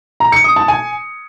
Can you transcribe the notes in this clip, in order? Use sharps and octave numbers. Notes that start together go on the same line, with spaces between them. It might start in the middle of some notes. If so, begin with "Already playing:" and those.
A#5
C#7
D#6
A5
G#5